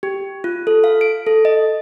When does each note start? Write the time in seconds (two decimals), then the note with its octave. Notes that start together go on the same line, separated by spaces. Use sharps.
0.03 G4
0.44 F4
0.67 A4
0.84 F5
1.01 D7
1.27 A4
1.45 D#5